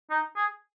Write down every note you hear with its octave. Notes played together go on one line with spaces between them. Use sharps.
D#4
G#4